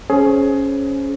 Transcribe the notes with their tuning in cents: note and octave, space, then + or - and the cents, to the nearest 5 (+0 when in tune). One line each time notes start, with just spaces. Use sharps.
C#4 +0 G#4 +20 C5 +0